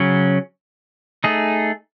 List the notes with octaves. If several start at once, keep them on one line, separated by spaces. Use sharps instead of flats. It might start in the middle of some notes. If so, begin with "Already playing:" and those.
Already playing: C#3 F#3 C#4
A3 D#4 G#4